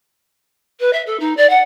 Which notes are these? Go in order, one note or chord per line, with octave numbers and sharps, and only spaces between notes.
B4
E5
A4
D#4
D5
F#5